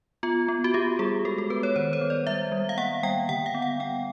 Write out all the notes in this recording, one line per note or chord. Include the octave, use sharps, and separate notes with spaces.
B3 F4
B3
F#4
B3 G4
G3 G#4
G#3 A4
A4
B3 B4
C#5
D#3 C5
C5
B3
D5
G3 E5
G3
F5
A#3 F#5
G3 G5
D3 F#5
F5
B3
F#5
B3 G5